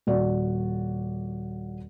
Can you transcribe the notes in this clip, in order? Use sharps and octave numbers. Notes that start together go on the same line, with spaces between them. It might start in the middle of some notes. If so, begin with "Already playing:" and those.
D#1 F#4 D5